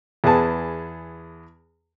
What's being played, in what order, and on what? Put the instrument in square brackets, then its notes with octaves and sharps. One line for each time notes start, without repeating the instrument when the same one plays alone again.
[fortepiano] E2 B3 G#4 A5